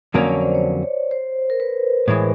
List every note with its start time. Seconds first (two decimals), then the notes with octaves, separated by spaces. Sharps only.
0.14 F2 D3 F#3 A#3 C#4 D5
0.28 C#5
0.41 C5
0.55 C#5
1.11 C5
1.50 A#4
1.60 B4
2.08 A2 E3 G#3